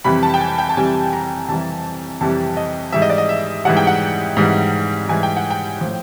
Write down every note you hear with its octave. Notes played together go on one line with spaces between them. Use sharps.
F2 C3 E3 G3 B5
A5
G5
G#5
G5
A5
F2 C3 E3 G3 G#5
A#5
F2 C3 E3 G3 A5
F2 C3 E3 G3 A5
D#5
G#2 E3 G3 E5
D#5
D5
D#5
E5
G#2 E3 G3 F#5
G5
F#5
G#2 E3 G3
G#2 E3 G3 G#5
G5
F#5
G5
A2 F3